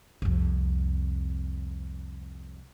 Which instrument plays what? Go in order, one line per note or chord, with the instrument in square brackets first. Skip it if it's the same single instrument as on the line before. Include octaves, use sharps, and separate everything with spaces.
[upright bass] C2 F2